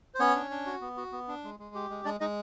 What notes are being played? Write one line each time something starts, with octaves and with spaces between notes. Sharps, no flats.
C5
B3 C#4 C#5
D4
D4
F#4
B3
F#4
B3
D4
G#3
G#3
G4
G#3
G#3 D4 D5
G#3 D#4 D#5